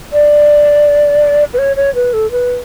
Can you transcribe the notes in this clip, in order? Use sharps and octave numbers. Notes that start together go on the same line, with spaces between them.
D5
B4
C#5
C#5
B4
A4
B4